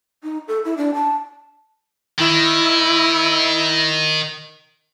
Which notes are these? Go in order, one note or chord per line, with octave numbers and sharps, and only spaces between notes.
D#4
A4
E4
D4
A5
D#3 E4